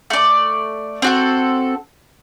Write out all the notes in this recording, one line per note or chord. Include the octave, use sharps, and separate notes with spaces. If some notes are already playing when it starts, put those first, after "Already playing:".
A3 D5
C4 F#4 A4